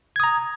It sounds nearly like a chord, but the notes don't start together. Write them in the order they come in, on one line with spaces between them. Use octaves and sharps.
G#6 D#6 A#5